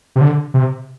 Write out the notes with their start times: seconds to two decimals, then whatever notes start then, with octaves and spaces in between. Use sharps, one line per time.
0.16 C3
0.21 D3
0.54 C3